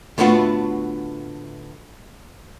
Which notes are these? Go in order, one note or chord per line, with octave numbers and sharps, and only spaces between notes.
A2 D3 A3 B3 F4 F#4